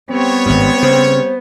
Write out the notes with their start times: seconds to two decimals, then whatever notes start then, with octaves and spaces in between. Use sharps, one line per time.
0.11 G3 B3 C4 C#5
0.46 G#1 G2
0.83 C#3 C5